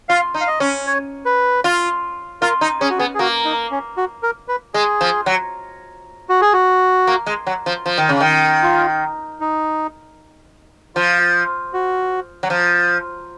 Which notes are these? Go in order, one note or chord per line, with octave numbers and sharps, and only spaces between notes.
F4 F5
D#4
F5
D#5
C#4
C#5
B4
F4
F4 A#4
D#4
C#4 G#4
F#4
B3 G#4
G#4
A#3 F#4
D#4
C#4
F#4
A#4
B4
G#3 G#4
F3
F#3
F#4
G#4
F#4
A#3
G#3
F#3
F3
F3
D#3
C#3
D#3
F4
D#4
F3 F4
F#4
F#3
F3